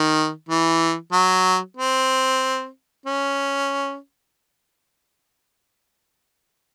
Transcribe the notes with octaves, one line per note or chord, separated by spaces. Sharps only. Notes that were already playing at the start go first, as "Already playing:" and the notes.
Already playing: D#3
E3
F#3
C4
C#4